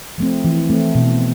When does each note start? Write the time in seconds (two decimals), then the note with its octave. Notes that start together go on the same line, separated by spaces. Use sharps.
0.18 F3 A3 C4
0.44 E3
0.70 A3 C4
0.95 B2